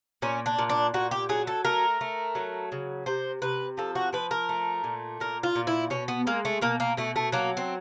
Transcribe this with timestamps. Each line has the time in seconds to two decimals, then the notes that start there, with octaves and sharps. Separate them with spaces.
0.22 A#2 C#4
0.46 D4
0.59 A#2
0.69 D4
0.94 A#2 F#4
1.11 G4
1.29 F#3 G#4
1.47 A4
1.65 A3 A#4
2.01 A3
2.35 F#3
2.72 C#3
3.06 C3 C5
3.42 C3 B4
3.77 F3 A4
3.95 F#4
4.13 F3 B4
4.31 A#4
4.49 A3
4.84 A#2
5.20 A#2 A#4
5.43 F4
5.55 A#2
5.67 E4
5.90 B2 C#4
6.08 B3
6.27 G#3 A#3
6.45 A3
6.61 B2 A#3
6.80 A#3
6.97 B2 A3
7.16 A3
7.32 F#3 A#3
7.57 C4